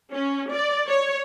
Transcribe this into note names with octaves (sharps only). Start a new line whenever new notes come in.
C#4
D5
C#5